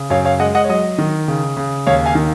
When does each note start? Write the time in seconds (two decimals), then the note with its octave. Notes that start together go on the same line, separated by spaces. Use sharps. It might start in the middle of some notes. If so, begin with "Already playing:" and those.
Already playing: C#3
0.10 F#2 C#5 F5
0.25 C#5 F5
0.40 G#3 D#5 F#5
0.55 D#5 F#5
0.64 C#5
0.69 F#3 D#5
0.98 D#3
1.28 C#3
1.57 C#3
1.87 D#2 C#5 F5
2.06 F5 G#5
2.15 D#3